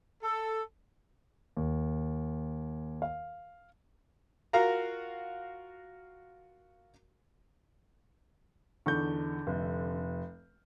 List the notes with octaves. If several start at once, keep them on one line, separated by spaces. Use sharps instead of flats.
A4
D#2
F5
F4 F#4 A#4 F5 A#5
E2 D3 D#4 C#6 G6
F1 E5